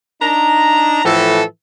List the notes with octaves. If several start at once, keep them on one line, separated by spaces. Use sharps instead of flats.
D4 D#4 A#5
A2 E3 F3 A4